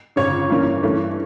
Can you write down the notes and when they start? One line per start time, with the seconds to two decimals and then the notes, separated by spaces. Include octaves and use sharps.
0.16 G1 F2 C#3 C#5
0.50 G2 E3 A#3 C#4
0.83 G2 E3 A3 C#4